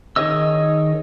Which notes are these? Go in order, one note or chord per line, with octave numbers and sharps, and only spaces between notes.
D#3 G#4 C#5 D#5 E6